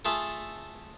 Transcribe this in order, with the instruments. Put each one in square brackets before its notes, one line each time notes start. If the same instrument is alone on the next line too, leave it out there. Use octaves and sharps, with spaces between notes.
[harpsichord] A3 F4 G#4 A4 E5 F5